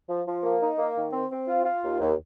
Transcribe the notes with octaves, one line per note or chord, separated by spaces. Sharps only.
F3
F3
A#3
D#4
A#3
D#3
C4
C4
F4
F4
D#2
D#2